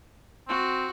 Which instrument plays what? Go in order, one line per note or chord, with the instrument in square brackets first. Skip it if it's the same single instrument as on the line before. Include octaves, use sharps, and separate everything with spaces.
[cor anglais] C4 [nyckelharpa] F#4